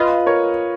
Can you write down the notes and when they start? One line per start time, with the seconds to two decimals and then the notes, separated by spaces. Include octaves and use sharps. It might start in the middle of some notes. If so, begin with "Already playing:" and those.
Already playing: F4 B4 D#5
0.26 A#4 C#5